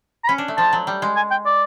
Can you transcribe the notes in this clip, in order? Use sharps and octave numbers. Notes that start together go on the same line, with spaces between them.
A#5
C#4 B5
D4
A3
F3 A5
F#3
G3
G#3
G#5
G5
D5